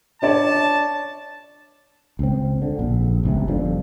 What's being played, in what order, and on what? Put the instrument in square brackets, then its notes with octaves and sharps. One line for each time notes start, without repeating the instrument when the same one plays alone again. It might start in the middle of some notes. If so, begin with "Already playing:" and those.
[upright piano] D4 C#5 D5 [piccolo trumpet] A5
[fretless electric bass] C#2 C4
D3
A#1
G1 C#2 C3
G1 F2 F3 D4